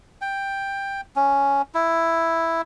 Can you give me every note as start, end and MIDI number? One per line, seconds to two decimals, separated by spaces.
0.21 1.01 79
1.16 1.62 61
1.75 2.62 64